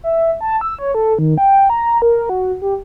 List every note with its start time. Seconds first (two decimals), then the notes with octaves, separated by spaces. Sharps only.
0.04 E5
0.41 A5
0.61 E6
0.79 C#5
0.95 A4
1.19 D#3
1.38 G5
1.70 A#5
2.02 A#4
2.29 F#4
2.62 G4